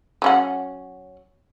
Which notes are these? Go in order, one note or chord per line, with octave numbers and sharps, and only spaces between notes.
F#3 C#4 F#5